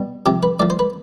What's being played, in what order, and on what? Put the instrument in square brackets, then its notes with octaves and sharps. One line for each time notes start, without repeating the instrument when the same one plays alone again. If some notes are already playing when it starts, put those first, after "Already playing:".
Already playing: [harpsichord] B2 G3
C3 F3 G4
B4
A2 F3 D5
C5
B4